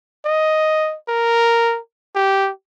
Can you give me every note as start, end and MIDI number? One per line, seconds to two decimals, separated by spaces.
0.25 0.96 75
1.08 1.79 70
2.15 2.50 67